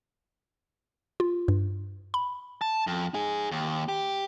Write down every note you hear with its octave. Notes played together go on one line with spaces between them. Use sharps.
F4
G2
B5
A5
F2
D#4 G#4
D#2
G4